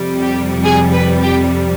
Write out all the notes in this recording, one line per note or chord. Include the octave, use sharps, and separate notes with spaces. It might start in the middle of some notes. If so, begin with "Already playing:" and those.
Already playing: F2 C3 G3
G4
G#4
B4
G4